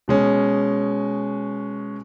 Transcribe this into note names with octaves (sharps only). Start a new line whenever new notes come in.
B2 G#3 C#4